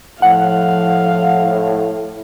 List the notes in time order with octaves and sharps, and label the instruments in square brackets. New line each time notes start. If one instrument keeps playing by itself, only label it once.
[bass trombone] A2 [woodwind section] F3 [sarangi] F5 [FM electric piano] F#5